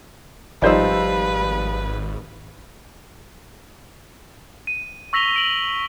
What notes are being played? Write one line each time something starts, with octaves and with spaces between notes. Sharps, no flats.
G#1 F3 G3 D#4 B4 C5 D5 E6
D#7
C#6 E6 A#6 B6 F7 G7
D7 F#7